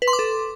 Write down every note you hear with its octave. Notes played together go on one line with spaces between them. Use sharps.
B4
C6
D6
A4